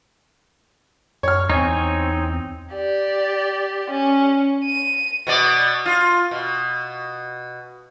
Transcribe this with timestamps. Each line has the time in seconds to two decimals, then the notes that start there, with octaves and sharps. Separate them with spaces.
1.23 F#2 C#5 F6
1.50 E2 C4 D#4 C#5 G#5 C#6
2.74 G4 D5
3.91 C#4
4.65 D#7
5.27 B2 B3 D5
5.86 F4
6.31 B2